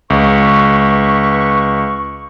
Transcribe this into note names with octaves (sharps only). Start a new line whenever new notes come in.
C#2 B4 C#6